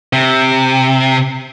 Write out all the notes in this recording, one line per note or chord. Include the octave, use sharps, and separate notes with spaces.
C3